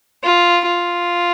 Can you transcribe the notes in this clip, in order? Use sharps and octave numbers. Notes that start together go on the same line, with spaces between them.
F4
F4